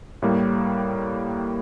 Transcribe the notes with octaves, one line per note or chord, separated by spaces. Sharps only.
A2 G3 A#3